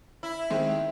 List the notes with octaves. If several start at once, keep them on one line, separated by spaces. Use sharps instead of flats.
E4
D#3 G#3 C4